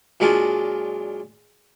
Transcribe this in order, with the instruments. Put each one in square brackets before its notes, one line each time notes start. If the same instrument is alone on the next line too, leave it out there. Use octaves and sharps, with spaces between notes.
[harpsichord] A#2 F#3 G#3 D4 F4